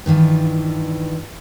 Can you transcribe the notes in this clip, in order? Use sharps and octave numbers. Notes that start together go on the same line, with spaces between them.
G2 D#3 E3 F4